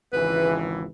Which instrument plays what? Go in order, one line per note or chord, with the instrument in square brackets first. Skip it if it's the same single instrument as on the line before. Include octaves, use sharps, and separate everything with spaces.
[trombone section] G#1 C#2 E3 [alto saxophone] B4